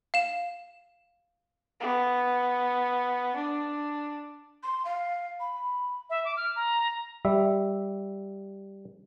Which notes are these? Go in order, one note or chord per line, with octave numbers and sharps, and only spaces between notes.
F5 E7
B3
D4
C6
F5
B5
E5
D6
F6
A#5
G3 E5